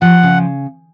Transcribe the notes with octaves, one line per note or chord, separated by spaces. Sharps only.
F3 F#5
C#3